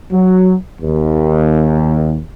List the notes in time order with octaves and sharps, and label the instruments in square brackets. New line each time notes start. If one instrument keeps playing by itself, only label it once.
[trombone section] F#3
D#2